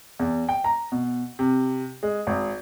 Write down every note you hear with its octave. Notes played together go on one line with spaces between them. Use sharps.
E2
G5
A#5
B2
C3
G#3
G#1